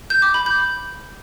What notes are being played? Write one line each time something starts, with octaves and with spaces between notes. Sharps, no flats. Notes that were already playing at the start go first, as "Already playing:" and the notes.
G6
D6
B5
G6